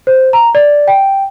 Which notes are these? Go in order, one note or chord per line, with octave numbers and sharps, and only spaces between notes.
C5
A#5
D5
G5